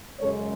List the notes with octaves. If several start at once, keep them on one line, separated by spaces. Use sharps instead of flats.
F#2 C#3 G#3 A4 C#5